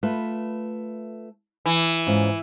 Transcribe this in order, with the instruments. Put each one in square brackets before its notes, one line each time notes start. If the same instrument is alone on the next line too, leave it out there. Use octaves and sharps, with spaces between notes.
[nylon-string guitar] A3 F4 B4
[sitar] E3
[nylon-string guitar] G#2 C#4 F4